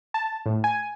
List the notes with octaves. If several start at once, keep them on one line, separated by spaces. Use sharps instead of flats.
A5
A2
G#5